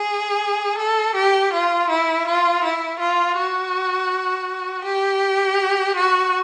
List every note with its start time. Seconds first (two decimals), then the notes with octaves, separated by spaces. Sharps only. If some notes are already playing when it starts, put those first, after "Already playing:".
Already playing: G#4
0.78 A4
1.15 G4
1.53 F4
1.90 E4
2.27 F4
2.64 E4
3.00 F4
3.37 F#4
4.85 G4
5.96 F#4